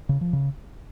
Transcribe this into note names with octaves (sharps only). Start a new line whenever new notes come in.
C#3
F3
C#3